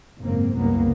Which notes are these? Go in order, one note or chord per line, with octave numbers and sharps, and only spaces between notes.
F#1 G#2 A#3 C4
F#1 C2 A#3 B3